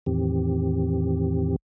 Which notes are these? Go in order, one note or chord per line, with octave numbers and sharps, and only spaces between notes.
E2 A2 D#3 E3 C4 G4